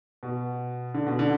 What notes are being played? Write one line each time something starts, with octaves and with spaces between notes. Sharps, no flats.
B2
D3
B2
D3